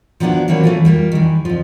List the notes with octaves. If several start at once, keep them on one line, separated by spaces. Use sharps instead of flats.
F3 F#3 B3 D4 E4
E3 F#3 A#3 C4 C#4
E3 A3 F4
G3 A#3 F4
D#3 E3
F2 F3